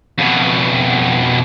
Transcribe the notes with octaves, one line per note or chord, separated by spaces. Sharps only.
F2 B2